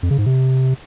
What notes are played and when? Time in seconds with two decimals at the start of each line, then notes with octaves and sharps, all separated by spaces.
0.03 F2
0.11 C#3
0.18 G#2
0.26 C3